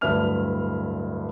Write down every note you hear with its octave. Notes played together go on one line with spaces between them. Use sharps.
D1 G2 E5 F6 F7